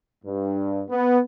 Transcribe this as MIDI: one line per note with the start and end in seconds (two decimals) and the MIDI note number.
0.25 0.84 43
0.90 1.19 59